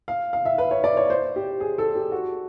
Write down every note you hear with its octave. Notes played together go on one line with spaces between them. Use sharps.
F5
F5
E5
B4
C#5
D5
C#5
C5
G4
G#4
A4
G4
F#4